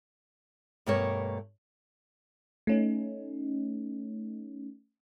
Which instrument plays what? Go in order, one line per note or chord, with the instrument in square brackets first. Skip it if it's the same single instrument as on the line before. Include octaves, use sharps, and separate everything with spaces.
[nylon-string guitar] G2 B2 A3 A#3 A#4 C#5
[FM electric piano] A3 C#4 D#4